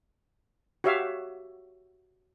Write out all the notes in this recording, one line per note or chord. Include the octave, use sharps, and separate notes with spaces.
F#4 G4 C#5 E5 F5